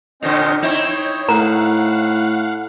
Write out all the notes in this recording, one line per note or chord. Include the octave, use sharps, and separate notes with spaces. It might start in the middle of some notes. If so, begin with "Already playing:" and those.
A#2 D3 C#4 C5 D#5
C4 D#4 E4 C#5
A2 F5 F#5 A#5